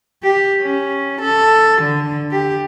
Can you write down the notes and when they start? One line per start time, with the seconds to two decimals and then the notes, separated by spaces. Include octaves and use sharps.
0.23 G4
0.61 C#4
1.21 A4
1.82 D3
2.32 G4